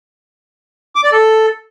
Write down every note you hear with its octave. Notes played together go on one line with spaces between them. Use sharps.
D6
D5
A4